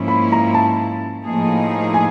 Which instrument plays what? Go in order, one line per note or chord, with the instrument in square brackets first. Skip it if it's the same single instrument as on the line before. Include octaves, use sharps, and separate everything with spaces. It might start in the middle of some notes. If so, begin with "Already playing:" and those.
Already playing: [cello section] G#2 F3 A#3 C#4 E4
[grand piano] B5
A#5
A5
[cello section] A2 F3 A#3 D#4 G#4
[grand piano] G#5